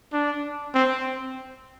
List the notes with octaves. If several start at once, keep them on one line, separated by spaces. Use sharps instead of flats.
D4
C4